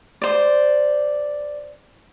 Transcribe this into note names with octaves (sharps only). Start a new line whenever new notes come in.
C5 D5